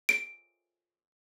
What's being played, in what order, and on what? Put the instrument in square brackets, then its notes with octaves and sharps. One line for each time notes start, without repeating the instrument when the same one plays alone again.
[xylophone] D7